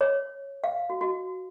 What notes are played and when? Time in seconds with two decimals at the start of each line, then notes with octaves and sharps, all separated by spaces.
0.01 C#5
0.64 F5
0.90 F#4
1.01 F#4